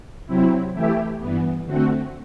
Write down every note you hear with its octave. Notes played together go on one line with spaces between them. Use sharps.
C3 F#3 C4 E4
E3 A3 E4 G4
G2 E3 B3
D3 A3 C4 F#4